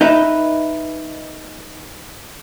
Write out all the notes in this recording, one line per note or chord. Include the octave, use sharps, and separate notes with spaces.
D#4 B4 E5